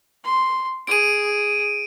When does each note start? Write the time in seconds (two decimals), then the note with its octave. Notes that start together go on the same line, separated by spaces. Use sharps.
0.24 C6
0.87 G#4 D7 D#7